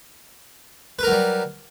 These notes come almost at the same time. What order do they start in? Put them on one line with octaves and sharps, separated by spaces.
B4 A#4 F#3 G3